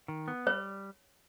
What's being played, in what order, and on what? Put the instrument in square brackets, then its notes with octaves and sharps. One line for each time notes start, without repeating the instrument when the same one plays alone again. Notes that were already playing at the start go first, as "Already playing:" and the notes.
[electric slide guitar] D#3
B3
[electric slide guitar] G3 [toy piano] C#5